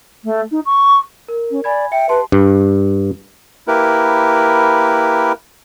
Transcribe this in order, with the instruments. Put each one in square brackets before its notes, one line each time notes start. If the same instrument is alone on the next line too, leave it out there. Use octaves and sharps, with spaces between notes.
[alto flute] A3
D#4
C#6
[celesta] A#4
[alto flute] C#4
[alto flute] D5 [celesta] G#5 B5 G#6
[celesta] E5 C#7 [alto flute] G5
[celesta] G4 A5 C6 [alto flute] B4
[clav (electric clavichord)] G2
[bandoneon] A#3 E4 G4 A#4 B4